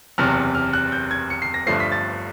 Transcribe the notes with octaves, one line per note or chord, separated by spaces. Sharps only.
F#1 E2 C3 F6
F6
F#6
G6
G#6
C#7
C7
A#6
G1 G2 D3 F3 A3 C7
B6
A6